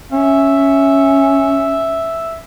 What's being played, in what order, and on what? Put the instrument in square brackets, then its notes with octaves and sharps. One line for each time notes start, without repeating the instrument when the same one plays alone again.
[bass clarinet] C#4 [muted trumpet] E5